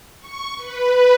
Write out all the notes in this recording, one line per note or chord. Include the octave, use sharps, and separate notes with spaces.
C#6
B4